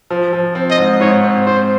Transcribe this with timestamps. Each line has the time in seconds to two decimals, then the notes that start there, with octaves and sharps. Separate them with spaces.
0.10 F3
0.33 F3
0.55 C4
0.71 D#5
0.78 G#2
1.00 G#2 C#5
1.23 C4
1.46 G#2 C5